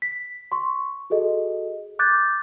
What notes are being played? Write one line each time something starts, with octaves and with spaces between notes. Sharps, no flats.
B6
C6 C#6
F#4 G#4 A4 D#5
D6 F#6 G6 A6